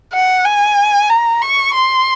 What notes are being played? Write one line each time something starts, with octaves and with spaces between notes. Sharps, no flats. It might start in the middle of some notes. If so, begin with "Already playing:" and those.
F#5
G#5
A#5
C#6
C6